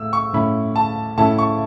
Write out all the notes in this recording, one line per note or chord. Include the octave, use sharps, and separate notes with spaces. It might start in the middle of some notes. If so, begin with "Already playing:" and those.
Already playing: A2 A3 E4 E6
C#6
A2 A3 C#4 E4 B5
A5
A2 A3 C#4 E4 A5
C#6